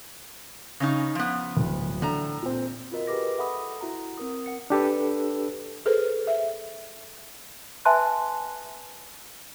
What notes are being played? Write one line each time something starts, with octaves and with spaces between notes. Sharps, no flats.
C#3 C#4 D#4
F3 B3
D1 D2
A2 D3 A#5
A#2 C4
F4 F#4 A#4 D#5
G4 G#4 B4 D6 A#6
A4 E5 F#5 B5 D#6
E4 F#4 F#5 A#5
C4 A#4 D#6
F#5 C#7
D4 G4 A4 B4
G#4 A4 B4 C5
E5
B4 E5 G#5 A5 C6 F#6